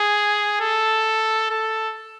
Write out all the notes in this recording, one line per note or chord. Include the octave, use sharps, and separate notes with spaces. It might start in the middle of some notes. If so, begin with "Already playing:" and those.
Already playing: G#4
A4
A4